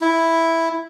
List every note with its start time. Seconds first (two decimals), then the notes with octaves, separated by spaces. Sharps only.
0.01 E4